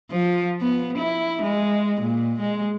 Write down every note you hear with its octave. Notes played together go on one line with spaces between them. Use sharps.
F3
B3
E4
G#3
A#2
G#3